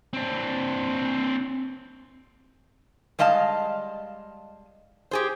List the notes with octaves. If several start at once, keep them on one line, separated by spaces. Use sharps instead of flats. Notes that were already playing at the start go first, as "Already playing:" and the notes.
C4 D4
G3 G#3 D#5 F5 A5
G4 G#4 C5